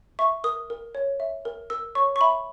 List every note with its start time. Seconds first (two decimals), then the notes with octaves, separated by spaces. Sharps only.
0.19 E5 C#6
0.44 A#4 D#6
0.70 A#4
0.95 C#5
1.20 E5
1.45 A#4
1.70 A#4 E6
1.95 C#5 C#6
2.16 C#6
2.21 E5 B5